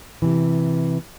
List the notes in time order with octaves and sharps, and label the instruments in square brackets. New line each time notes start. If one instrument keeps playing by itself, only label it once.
[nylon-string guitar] C3 E3